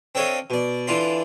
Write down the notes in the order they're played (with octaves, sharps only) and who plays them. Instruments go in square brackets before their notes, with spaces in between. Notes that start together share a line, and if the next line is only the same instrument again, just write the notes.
[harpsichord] C4 D4 A4 C#5 D#5 F5
B2 D5
D3 E3 F4 D5 C6